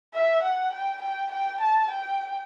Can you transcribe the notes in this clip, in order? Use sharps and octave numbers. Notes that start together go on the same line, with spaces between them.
E5
F#5
G5
G5
G5
A5
G5